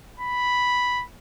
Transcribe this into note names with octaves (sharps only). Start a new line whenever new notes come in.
B5